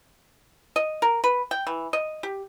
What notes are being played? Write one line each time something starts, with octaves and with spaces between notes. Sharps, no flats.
D#5
A#4
B4
G5
E3
D#5
G4